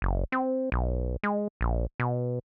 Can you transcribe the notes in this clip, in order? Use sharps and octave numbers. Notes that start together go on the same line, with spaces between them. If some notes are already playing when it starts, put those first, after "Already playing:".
F#1
C4
B1
G#3
A#1
B2